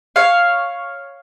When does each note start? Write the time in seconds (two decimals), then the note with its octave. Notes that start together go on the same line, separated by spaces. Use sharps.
0.16 C#5 F5